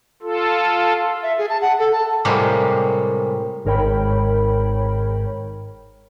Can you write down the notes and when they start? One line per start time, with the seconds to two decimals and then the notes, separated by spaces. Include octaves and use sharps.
0.22 F4 A4
1.23 E5
1.38 G#4
1.49 A5
1.62 F#5
1.79 A4
1.93 A5
2.25 A2 C3 G3 G#3 A#3 G4
3.65 G#1 G#2 A#4 C#5 G5 B5